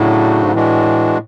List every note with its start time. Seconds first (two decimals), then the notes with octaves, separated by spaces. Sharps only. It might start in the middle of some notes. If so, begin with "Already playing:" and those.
Already playing: A2 C#3 F#3 A3 D4 F#4
0.44 G#2
0.54 A2 E3 G#3 D4 F#4